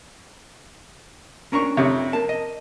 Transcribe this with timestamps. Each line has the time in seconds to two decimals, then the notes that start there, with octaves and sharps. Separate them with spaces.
1.52 A#3 C#4 D4 A#4 A#5 C#6
1.77 F2 C3 C#5
2.13 A#3 A5
2.29 D#5